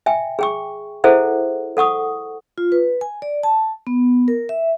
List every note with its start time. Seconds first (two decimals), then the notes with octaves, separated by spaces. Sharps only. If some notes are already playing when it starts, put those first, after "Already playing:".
0.06 E5 G5 G#5
0.39 G#4 G5 C#6
1.04 E4 G#4 A4 C5 E5 F#5
1.77 A4 F#5 C#6 D#6
2.58 F4
2.72 B4
3.01 G#5
3.22 D5
3.43 A5
3.87 B3
4.28 A#4
4.49 E5